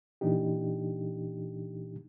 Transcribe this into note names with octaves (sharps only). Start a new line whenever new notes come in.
A#2 E3 D4 D#4 G4